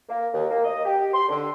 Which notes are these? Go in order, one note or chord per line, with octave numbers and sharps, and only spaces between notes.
A#3
D#2
A#3
D#5
G4
C6
D3